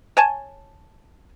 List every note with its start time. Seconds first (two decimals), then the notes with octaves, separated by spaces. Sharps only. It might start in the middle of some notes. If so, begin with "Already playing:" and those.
0.17 C#5 G#5 A5